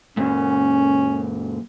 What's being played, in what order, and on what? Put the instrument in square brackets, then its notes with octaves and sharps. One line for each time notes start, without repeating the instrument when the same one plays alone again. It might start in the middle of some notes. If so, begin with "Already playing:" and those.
[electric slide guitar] F#2 A#2 [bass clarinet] C#4